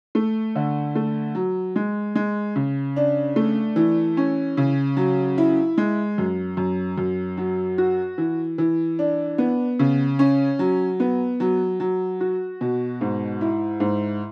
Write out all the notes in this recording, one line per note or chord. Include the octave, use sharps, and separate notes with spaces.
A3
D3
A3
F#3
G#3
G#3
C#3
D4
A3
E3
C#4
C#3
F#3
E4
G#3
F#2
F#2
F#2
F#3
F#4
E3
E3
D4
B3
C#3
C#4
F#3
B3
F#3
F#3
F#4
B2
G#2
E4
G#2